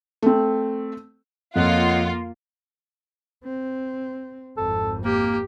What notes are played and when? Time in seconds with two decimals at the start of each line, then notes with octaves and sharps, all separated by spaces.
0.22 A3 C4
1.56 F2 A#3 F4 C#5 D#5 F#5
3.44 C4
4.58 G#1 F2 A4
5.05 A#3 G4